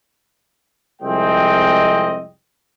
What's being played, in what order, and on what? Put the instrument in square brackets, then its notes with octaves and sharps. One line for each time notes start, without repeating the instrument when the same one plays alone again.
[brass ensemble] C2 F2 G#3 C4 D#5 G5